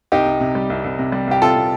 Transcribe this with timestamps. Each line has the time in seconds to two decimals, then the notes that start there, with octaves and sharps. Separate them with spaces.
0.12 C2 D#4 G4
0.26 C2
0.40 C3
0.55 G3
0.70 C2
0.84 C2
0.99 C3
1.12 G3
1.27 C2 G4
1.42 C2 F4 A4
1.57 C3